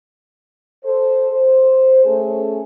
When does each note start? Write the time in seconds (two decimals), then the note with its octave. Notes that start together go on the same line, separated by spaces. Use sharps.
0.84 A4 C5
1.32 C5
2.04 A3 C#4 G#4 A4